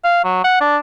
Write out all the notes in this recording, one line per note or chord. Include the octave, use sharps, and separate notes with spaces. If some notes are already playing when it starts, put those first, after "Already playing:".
F5
F#3
F#5
D4